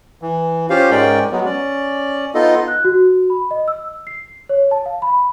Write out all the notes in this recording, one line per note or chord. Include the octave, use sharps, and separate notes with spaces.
E3
C#4 F4 G4 C5 F5
G#2 G#3 C#4 A#4 D5 G5
F#3 G#3 B3
C#4 D5
B3 D#4 F4 A4 D#5
F#6
F#4
B5
D#5
E6
C7
C#5
A5
F5
B5